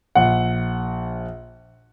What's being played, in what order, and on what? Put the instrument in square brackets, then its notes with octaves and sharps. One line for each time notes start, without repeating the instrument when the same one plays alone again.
[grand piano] A#1 F#5